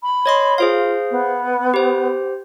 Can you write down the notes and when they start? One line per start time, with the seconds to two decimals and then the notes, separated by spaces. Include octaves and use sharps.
0.02 B5
0.26 C#5 D#5 C6
0.58 F4 G#4 C5 F5
1.10 B3
1.74 G4 C5